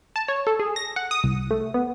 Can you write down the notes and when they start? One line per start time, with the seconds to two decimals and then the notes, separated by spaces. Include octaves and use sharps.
0.16 A5
0.28 C#5
0.47 A4
0.60 G#4
0.76 A#6
0.96 F#5
1.11 D#6
1.24 C2
1.51 A3
1.74 B3